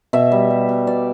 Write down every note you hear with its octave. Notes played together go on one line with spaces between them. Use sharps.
B2 E5
G3
G3
B2
B2 D5